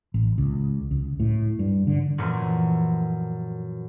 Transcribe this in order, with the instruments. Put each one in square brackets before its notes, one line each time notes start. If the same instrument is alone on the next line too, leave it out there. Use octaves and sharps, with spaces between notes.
[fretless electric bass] A1
C#2
C#2
A2
G2
D3
[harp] F#2 A#2 E3 F3 A3